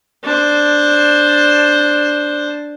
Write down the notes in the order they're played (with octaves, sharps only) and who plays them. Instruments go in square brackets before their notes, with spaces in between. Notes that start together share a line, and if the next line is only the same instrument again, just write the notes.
[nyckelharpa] D4 C5